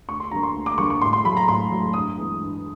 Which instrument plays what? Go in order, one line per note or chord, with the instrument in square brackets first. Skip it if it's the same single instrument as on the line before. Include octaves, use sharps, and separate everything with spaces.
[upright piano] D2 C#6
C6
D3 G3 A#3 A#5
C6
D2
D6
D3 G3 A#3 C#6
C#6
A2 C6
C6
F#3 A3 B5
A#5
A2 C6
F#3 A3
G2 D#6
E3 G#3 B3
G2